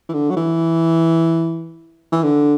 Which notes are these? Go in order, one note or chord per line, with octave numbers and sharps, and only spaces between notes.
E3
D3
F#3
E3
E3
D3